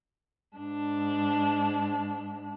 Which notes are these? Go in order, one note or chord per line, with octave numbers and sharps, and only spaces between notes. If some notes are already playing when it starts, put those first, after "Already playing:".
G#2 D4